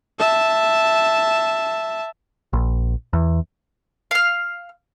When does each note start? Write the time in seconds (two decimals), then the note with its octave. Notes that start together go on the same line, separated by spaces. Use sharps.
0.19 E5 A5
2.53 A#1
3.13 E2
4.11 F5 F6